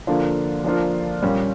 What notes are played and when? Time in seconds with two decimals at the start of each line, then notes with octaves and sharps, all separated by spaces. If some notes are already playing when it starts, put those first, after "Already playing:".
0.07 D3 F3 A#3 D4 F4
0.64 F3 A#3 D4 F4
1.23 A#2 G3 C#4